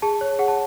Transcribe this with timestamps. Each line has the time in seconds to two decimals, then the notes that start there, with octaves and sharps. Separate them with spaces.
0.02 G#4 A5
0.21 C#5
0.39 G#4 F#5
0.48 A5